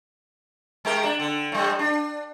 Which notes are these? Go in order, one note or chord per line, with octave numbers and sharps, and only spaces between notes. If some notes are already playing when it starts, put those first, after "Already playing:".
G#3 G4 A#4
D4
D3
A2 G3
D4